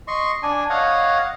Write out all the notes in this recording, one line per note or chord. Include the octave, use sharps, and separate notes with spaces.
D#5 C6 C#6
D4 D5 G#5
C#5 D#5 F5 F#5